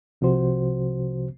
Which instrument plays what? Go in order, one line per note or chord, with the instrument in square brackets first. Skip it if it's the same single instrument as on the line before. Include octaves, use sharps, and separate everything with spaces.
[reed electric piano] C2 C3 F3 F#4 C5